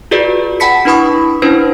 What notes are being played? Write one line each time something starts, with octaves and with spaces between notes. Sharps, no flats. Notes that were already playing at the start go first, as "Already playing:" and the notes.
F4 F#4 G#4 B4 D5
F#5 G5 A5 B5 B6 C#7
D4 E4 B4 B5 C#6 D#6
C#4 D4 E4 B4 C5